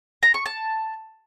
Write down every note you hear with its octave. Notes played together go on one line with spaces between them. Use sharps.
A#5
C#6
A5